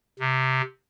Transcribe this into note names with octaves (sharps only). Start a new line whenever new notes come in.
C3